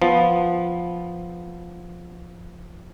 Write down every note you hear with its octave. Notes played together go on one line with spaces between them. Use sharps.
F3 B3